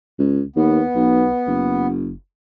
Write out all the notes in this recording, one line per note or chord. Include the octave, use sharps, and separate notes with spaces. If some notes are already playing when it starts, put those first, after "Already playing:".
C#2
D#2 B3
B1
F#1